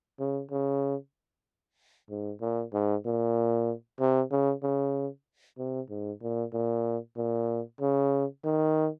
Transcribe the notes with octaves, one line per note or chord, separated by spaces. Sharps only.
C#3
C#3
G#2
A#2
G#2
A#2
C3
C#3
C#3
C3
G#2
A#2
A#2
A#2
C#3
D#3